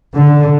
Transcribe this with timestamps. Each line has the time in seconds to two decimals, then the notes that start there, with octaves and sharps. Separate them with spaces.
0.14 D3